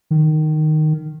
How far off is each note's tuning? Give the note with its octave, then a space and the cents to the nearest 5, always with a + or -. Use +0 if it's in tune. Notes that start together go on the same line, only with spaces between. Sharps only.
D#3 -10